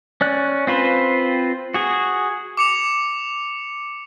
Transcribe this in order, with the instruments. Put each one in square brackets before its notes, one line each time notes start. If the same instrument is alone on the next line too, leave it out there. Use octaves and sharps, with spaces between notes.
[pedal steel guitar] C#4 D5 F#6
C4 F4 B4 C5
F#4 G#4
[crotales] D6 C#7 F7